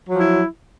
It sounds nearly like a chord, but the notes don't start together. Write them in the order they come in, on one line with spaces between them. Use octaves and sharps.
F#3 F3 E4